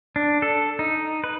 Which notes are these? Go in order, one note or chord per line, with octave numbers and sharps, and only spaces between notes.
D4
A4
D#4
B4